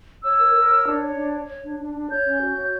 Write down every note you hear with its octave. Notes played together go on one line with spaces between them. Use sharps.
C#5 E6
A#4
A#4
C#5
D4
C#5
D4
C#5
C#5
D4
D4
D4
C#5 G6
C#4
F#4
C#5